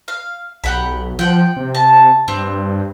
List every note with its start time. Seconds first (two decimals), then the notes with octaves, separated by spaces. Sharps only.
0.08 F5
0.64 B1 G4 F#5 B5
1.19 F3 F#5 G5
1.56 C3
1.75 A5
2.28 G2 C4